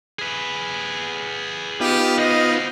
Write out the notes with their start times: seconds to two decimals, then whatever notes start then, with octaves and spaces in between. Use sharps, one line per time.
0.19 G#4 B4
1.80 B3 D#4 F4 G4
2.18 F#4 C5 D#5